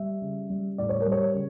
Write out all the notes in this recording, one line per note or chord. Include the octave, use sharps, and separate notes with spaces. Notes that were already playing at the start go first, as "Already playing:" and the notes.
Already playing: G3 E5
C#3
G3
A2 D5
C#5
A#4
G3
C#5
C#3